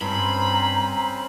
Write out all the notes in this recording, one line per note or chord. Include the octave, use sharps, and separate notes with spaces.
G2 C4 C#4 C5 A#5 B5